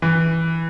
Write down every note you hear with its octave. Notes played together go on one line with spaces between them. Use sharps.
E3